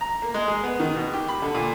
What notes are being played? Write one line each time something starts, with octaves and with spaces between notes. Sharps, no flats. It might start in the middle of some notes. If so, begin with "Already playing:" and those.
A#5
A#3
G#3
G#4
B3
D#3
B2
G4
B5
D3
A#2